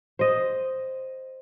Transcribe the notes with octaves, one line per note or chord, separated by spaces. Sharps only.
C5 D#5